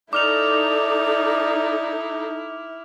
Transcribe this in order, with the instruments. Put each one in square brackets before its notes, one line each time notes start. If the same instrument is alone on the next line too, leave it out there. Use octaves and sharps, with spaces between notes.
[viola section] D#4 A4 [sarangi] E4 [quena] D5 [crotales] D6 F6 F7